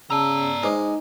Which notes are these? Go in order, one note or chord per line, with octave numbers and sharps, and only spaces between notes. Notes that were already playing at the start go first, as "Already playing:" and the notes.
C#3 D5 A5 A#5 E6
G#3 D#4 B4 C5 D6